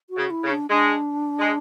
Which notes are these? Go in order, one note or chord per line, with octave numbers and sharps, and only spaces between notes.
F#4
C#3
E4
C#3
D4
G#3 D4
G#3